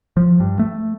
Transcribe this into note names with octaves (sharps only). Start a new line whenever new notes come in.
F3
G2
A3